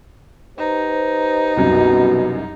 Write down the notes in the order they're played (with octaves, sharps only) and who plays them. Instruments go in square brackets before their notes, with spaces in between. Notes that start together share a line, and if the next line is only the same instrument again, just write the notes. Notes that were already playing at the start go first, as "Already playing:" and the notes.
[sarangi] D#4 [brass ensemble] G4 B4 C5
[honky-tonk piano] C2 F#2 [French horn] B2 [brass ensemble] F#4